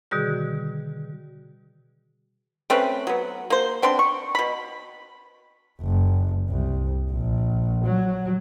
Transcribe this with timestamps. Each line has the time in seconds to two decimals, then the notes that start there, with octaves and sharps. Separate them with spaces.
0.11 B2 D3 D#3 G3 F#4 G#4
2.70 A3 C4 C#4 B4
3.07 F#3 B3
3.50 A#3 C5
3.82 B3 C4 D4 C6
3.99 C#6
4.35 B2 B5
5.81 F#1
6.49 C2
7.10 A#1
7.85 F#3